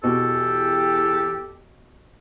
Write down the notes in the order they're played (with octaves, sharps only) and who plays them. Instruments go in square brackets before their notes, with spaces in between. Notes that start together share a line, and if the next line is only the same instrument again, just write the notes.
[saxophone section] E2 G4 [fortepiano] B2 [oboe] A4